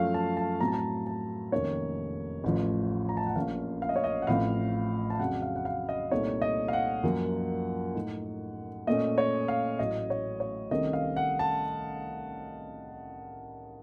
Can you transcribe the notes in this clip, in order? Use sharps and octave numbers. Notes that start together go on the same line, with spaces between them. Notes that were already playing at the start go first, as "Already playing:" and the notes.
Already playing: F#2 F3 A3 C#4 F5
A5
A5
A2 F#3 C4 A#5
A5
A#5
A5
F1 F2 D#3 A#3 C#4 C#5
A1 A2 F3
A#5
A5
F#5
A#1 A2 F3 A#3 C#4 F5
F5
D#5
C#5
D#5
F#5
A1 A2 F3 C4 F5
A5
F2 C#3 F#3 F#5
F5
F#5
F5
D#5
C2 A#2 A3 C4 D#4 C#5
D#5
F5
F#5
F#2 F3 A#3 F4
A2 A3 D#4
A#2 A3 C#4 D#5
C#5
F5
A1 A2 F#3 D#5
C#5
C#5
C2 C3 D#3 A3 C#4 D#5
F5
F#5
A5